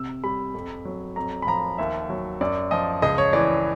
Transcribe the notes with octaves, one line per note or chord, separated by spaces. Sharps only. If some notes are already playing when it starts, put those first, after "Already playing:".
Already playing: C3 E6
G3 B5
F2
F#3
F2 A#5
B5
F3 A#5
D#2 E5
F#3
F#2 D5
F3 D#5
C#2 D#5
C#5
E3 D5